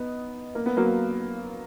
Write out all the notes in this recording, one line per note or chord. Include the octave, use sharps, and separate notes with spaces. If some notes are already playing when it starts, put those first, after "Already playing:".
Already playing: B3 D#4
A#3
B3
F#3 A#3